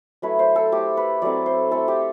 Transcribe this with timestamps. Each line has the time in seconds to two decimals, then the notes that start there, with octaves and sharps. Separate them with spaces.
0.22 F#3 A3 E4 B4
0.39 C5
0.56 A4
0.72 A3 E4 G4
0.97 B4
1.22 F#3 A3 C4 E4 D5
1.46 C5
1.71 A3 C4 E4 A4
1.88 G4